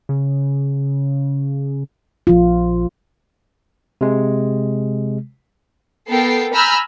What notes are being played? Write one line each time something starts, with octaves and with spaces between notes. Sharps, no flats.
C#3
A#1 F3 F4
C3 G#3
B3 A4 A#4 G5 C7
G#5 A#5 B5 E6 F6 G6